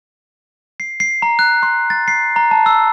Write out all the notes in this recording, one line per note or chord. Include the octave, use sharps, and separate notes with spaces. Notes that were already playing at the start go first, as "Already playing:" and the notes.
C7
C7
A#5
F#6
C6
A6
C7
A#5
A5
E6